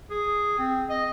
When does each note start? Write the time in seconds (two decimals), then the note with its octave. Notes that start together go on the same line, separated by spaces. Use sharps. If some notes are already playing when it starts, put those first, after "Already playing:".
0.10 G#4
0.59 C4
0.90 D#5